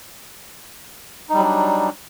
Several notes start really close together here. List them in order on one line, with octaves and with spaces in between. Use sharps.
D#4 G3 F#3 D4